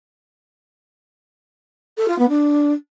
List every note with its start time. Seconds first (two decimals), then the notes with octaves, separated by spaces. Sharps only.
1.98 A4
2.08 F4
2.19 B3
2.29 D4